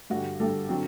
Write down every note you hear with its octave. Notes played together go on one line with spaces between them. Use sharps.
G2 D3 G3 F#4
G2 D3 G3 A4
D3 F#3 C4